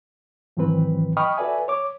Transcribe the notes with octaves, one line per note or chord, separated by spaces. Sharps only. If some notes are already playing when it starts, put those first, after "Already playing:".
G#2 D#3 E3 F#3 C4 B4
D#5 G5 B5 C#6 D#6 F6
F#4 A4 B4 D5 E5 G#5
C#5 D6